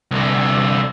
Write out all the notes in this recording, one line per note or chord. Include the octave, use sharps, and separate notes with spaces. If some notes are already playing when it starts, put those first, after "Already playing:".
C2 D3